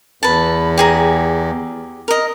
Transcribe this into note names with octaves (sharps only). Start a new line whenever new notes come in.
E2 B4 A5
G4 G#4 A#5
A#4 D#5